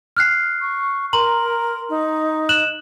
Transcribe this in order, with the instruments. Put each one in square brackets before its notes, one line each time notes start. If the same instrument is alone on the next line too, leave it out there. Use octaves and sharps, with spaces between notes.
[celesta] F6 F#6 C7
[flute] C#6
[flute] A#4 [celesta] A#5 C6 F#7
[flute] D#4
[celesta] F#6 E7 F#7